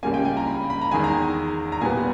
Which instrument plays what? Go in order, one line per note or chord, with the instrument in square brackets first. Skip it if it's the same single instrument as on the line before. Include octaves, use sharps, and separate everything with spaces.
[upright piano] C#2 C#3 G3 A#3 G#5
G5
G#5
A#5
B5
B5
A#5
E2 D#3 G#3 G#5
A#5
A#5
A#2 G3 B3 G#5